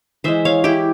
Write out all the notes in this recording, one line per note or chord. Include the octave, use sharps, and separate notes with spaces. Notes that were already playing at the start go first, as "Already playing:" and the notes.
E3 G#3 C5 E5
C#5 F5
E4 G4